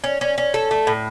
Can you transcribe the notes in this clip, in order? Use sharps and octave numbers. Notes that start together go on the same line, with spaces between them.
C#4
C#4
C#4
A4
A3
A2